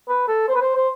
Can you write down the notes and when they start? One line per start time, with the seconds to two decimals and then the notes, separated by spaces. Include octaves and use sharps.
0.09 B4
0.28 A4
0.48 C5
0.55 B4
0.61 C5
0.76 C5